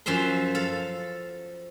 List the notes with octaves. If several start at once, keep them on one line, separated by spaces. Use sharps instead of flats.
F#2 F3 E5 F5 C6
A4 F5